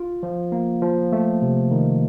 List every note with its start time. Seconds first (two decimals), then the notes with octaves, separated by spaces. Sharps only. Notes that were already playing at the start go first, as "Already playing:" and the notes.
Already playing: F4
0.23 F3
0.52 A#3
0.82 F3
1.12 A3
1.42 C3
1.71 D#3